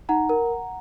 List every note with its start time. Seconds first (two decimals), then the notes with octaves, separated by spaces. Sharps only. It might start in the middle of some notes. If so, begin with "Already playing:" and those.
0.09 D#4 F#5 A#5
0.29 A#4